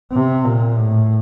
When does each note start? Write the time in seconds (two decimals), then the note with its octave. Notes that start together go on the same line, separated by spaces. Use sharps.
0.12 C3
0.45 A#2
0.78 A2